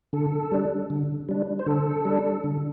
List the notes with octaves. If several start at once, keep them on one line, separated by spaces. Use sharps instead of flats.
D3 A4
G3 D4
D3
G3 D4
C5
D3 A4
G3 D4
D3